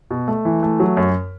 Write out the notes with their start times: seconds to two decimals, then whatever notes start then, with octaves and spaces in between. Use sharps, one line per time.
0.11 B2
0.28 A3
0.45 E3
0.63 A3
0.80 F#3
0.97 F#2